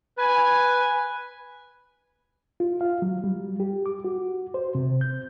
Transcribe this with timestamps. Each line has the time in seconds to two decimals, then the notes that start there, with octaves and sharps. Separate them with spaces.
0.17 B4 G#5
2.60 F4
2.81 F5
3.02 F#3
3.24 G3
3.60 G4
3.86 D6
4.04 F#4
4.54 C5
4.75 C3
5.01 G6